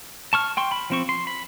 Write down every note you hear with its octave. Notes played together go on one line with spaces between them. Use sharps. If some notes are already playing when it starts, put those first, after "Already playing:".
A5 C#6 F6
G5 C6 C#6
B5
F3 C4 C#6
C6
B5